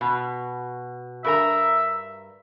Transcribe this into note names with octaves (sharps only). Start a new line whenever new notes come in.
B2
G2 A#4 E5 A#5